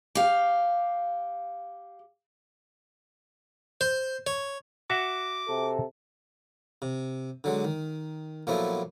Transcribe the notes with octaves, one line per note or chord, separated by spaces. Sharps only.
G4 F5
C5
C#5
F#4 E5 F#5 D6
C3 A4
C3
D3 F#3 G#3
D#3
A#2 F3 F#3 A3 B3 E4